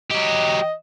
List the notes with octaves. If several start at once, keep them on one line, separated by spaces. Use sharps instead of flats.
F#3 G4 D#5